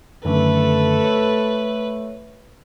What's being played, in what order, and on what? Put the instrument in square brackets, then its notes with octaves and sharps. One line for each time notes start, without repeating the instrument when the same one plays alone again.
[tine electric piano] F#2 D3 D#3 [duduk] A3 [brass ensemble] A4 [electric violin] B4
[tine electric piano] C#5